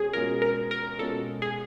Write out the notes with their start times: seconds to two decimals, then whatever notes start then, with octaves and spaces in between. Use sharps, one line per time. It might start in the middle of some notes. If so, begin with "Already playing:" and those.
Already playing: B2 G#3 C#4 G#4
0.13 B2 G#3 C#4 F4 A#4
0.42 A#4
0.71 A#4
0.99 B2 G#3 C#4 F4 A4
1.42 G#4